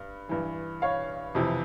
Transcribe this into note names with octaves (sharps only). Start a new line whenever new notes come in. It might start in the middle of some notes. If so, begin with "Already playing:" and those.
Already playing: G2
G2 E3
C#5 F5
F2 C3 E3